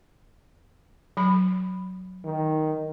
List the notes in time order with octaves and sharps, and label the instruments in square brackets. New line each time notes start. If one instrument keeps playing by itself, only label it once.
[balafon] F#3 B5
[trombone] D#3